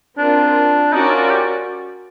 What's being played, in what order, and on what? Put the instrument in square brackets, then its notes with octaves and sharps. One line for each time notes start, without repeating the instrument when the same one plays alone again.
[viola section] C4 F4 A#4 [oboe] D4
[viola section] C#4 F#4 A#4 D5 [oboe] D#4
[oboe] F4
G4